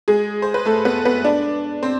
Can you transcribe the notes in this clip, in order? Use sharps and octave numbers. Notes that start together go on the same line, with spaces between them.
G#3 G#4
C5
B4
A3 A4
B3 B4
B3 B4
D4 D5
C4 C5